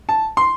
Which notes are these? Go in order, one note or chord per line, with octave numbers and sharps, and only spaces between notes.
A5
C6